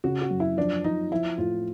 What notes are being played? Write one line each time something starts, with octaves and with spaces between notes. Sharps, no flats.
C#3 F#4
F#4
F#2
E4
F3 D4
F3 D#4
F3 E4
A2 F4